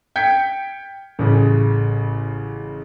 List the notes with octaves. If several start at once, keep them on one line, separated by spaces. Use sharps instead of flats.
G5 G6 G#6 B6 C#7
A1 C#3